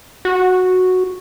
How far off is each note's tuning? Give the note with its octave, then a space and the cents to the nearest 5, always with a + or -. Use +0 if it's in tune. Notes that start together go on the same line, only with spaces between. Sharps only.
F#4 -5